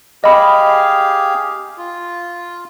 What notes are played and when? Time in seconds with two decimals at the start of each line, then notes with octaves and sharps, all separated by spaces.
0.24 G4 G#4 D#5 F5 B5
1.78 F4